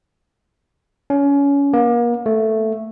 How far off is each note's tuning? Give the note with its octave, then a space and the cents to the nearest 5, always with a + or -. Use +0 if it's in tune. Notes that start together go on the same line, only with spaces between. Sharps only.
C#4 +25
A#3 +35
A3 +0